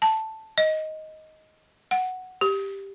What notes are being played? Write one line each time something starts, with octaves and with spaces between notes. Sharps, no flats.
A5
D#5
F#5
G4